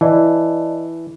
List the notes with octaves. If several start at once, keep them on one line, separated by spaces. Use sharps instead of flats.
E3 D5 D#5 A5